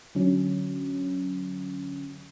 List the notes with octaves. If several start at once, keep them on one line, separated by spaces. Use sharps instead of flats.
D3 F#3 C#4